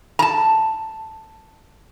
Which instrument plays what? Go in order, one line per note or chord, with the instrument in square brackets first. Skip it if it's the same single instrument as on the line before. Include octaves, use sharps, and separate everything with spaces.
[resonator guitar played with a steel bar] A5 A#5